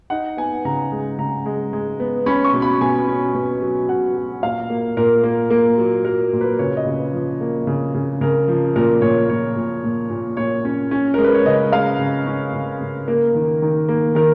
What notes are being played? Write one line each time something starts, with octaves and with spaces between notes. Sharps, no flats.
D#4 F#5
B3 G#5
C#3 A#5
G#3
C#3 A#5
G#3
G#3
B3
C#4 B5
C#6
B2
B5
B2 G#5
C#4
B2
F#3
B2 F#5
F#3
A#2 F5
A#3
A#2 A#4
A#3
A#3
F#3
F#3 A#4
A#2
B4
C#3 C#5
D#5
C#3
B4
F3
A#3
C#3
C#3
C#3 A#4
F3
A#2 A#4
A#2 C#5
A#2 C#5
A#2
A#2
A#2
A#2 C#5
C#4
C#4
G#3 A#4
B4
C#5
C#3 D#5
G#3 F5
C#3
C#4
C#3
C#3
A#3 A#4
D#3
D#3
A#3
D#3 A#4